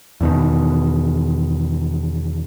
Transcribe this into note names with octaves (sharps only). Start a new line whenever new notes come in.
E2 B2 D#3